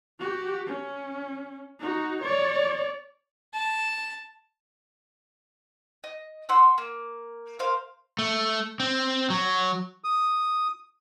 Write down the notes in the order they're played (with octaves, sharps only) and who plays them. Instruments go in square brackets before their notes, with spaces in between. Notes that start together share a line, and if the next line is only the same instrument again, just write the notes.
[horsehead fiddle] F#4 G4
C#4
D#4 F#4
C#5 D5
[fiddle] A5
[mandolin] D#5
F#5 C6 E6
A#3
A#4 C5 F5
[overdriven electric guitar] A3
C4
F#3
[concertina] D#6